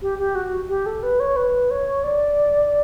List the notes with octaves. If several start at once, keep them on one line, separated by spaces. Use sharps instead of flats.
G4
G4
F#4
G4
A4
B4
C#5
B4
C#5
D5